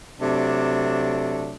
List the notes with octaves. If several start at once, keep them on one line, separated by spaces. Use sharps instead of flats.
C3 F#3 A3 D4